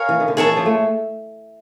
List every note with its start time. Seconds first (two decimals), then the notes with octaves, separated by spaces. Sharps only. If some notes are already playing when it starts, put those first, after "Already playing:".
Already playing: A#4 C#5 F5 G#5
0.09 E3
0.20 D#3
0.28 D3
0.37 D#3 G#4 C#5 E5 A5
0.47 E3
0.57 F3
0.66 A3